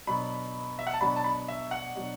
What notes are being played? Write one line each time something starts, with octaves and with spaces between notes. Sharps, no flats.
B2 F#3 D4 B5
E5
F#5
A5
B2 F#3 D4 B5
A5
B5
E5
F#5
B2 F#3 D4